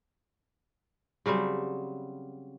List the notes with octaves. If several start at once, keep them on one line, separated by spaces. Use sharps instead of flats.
C#3 F#3 G3 C4